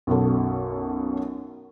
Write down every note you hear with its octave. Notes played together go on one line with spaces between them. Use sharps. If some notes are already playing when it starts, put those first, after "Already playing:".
B1 F#2 B2 A4